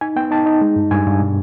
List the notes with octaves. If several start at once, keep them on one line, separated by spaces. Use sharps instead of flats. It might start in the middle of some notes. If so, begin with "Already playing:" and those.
D#4 G#5
B3 G5
D#4 A5
D#4
G#3
G2
G2 G#5
G2
B2